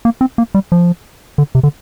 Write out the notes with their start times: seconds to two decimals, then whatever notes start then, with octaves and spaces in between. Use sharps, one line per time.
0.05 A#3
0.21 C4
0.38 A#3
0.55 G3
0.72 F3
1.38 D3
1.55 C3
1.63 D3